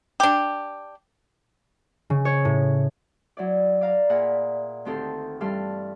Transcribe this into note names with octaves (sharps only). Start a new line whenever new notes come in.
D4 G4
C#3
C#5
A2
F#3 E4 D5
D5 F5 A#5
A#2 G#4 E5 F#5 A#5 B5
D2 D#3 C4 G4 A4 C6
G2 E3 G3 A4 C6 F6